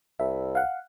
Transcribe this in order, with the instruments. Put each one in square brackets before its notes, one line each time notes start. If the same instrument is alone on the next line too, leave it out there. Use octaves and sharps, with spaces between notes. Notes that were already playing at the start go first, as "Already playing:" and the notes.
[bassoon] C2 [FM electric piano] E5
[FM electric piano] F5 F#5